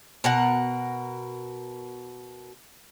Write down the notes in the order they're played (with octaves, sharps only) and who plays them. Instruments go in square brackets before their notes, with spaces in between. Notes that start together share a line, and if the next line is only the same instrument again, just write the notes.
[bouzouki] B2 A#4 F#5